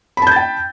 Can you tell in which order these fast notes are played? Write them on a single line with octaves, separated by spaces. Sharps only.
B5 A5 G6 A6 G5